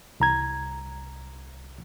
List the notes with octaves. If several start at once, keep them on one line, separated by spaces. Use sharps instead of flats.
C2 A#5 G#6